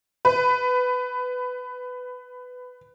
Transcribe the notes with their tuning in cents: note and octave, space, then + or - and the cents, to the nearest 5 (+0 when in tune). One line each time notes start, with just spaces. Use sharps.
B4 +15